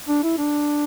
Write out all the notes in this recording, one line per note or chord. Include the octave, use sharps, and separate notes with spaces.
D4
E4
D4